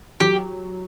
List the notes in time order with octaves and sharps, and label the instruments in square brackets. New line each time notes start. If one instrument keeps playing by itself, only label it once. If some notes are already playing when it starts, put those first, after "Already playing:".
[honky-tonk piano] F#3 [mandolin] G4